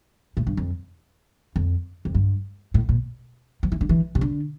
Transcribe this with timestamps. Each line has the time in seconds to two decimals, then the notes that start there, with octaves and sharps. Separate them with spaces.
0.37 A2
0.47 G2
0.57 F2
1.56 F2
2.05 F2
2.15 G2
2.74 A2
2.89 A#2
3.63 F3
3.72 E3
3.81 D3
3.89 E3
4.15 C3
4.21 D3